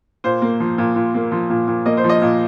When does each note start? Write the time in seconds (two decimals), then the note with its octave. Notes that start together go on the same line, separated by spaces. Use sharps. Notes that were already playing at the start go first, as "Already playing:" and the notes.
0.24 A#2 C5
0.42 A#3
0.60 F3
0.78 A#2
0.96 A#2
1.14 A#3
1.32 F3
1.50 A#2
1.68 A#2
1.86 A#3 D#5
1.97 C5
2.04 F3
2.09 D#5
2.22 A#2